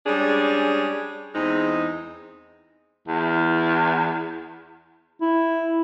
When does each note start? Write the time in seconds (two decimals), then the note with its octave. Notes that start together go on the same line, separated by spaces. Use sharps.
0.06 G3 G#3 C#4 D4 G#4
1.35 E2 G#3 C4 D#4
3.08 E2
5.21 E4